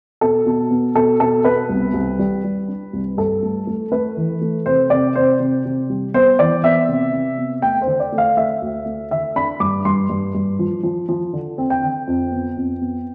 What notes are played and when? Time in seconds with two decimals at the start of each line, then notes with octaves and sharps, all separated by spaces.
0.21 B2 A4
0.46 B2
0.71 B3
0.95 B2 A4
1.20 B2 A4
1.44 B3 B4
1.69 C2
1.94 C2
2.19 G3
2.44 G3
2.68 D4
2.93 C2
3.17 G2 A4
3.43 A3
3.67 A3
3.92 A3 B4
4.17 E3
4.41 A3
4.66 C3 C5
4.90 C3 D5
5.15 C3 C5
5.40 C3
5.65 C3
5.90 G3
6.14 B3 C5
6.39 E3 D5
6.64 B3 E5
6.88 C3
7.13 C3
7.38 B3
7.62 A3 G5
7.81 C5
7.87 D3
8.00 D5
8.12 A3
8.18 F5
8.37 A3 E5
8.62 D2
8.86 A3
9.11 D3 E5
9.36 D4 B5
9.60 G2 D6
9.85 G2 C6
10.09 G2
10.35 G2
10.59 F3
10.83 F3
11.09 F3
11.33 D3
11.58 C4
11.70 G5
11.83 D3
12.07 F2
12.32 B3
12.57 F2
12.81 B3